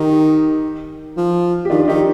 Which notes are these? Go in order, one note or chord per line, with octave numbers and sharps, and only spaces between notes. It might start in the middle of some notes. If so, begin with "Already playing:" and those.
Already playing: D#3 D#4 G4
F3
G4
D#3 D4 F4
D#3 D#4 G4